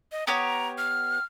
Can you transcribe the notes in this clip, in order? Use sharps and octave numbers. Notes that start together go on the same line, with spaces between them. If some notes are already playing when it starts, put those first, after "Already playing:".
D#5
B3 G4 C#5 A#5
F6